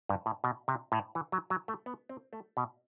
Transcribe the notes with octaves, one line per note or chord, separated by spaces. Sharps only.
G2
A2
B2
C3
A2
E3
F#3
F#3
A3
B3
C4
A3
B2